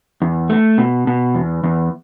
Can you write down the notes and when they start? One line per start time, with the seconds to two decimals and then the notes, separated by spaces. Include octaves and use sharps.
0.22 E2
0.49 A3
0.78 B2
1.07 B2
1.35 E2
1.64 E2